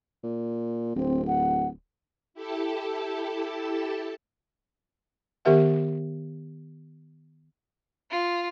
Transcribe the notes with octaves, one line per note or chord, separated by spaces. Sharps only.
A#2
D1 C4
F#5
E4 G4 A4 A5
D#3 B3 G4 A#4 E5 F#5
F4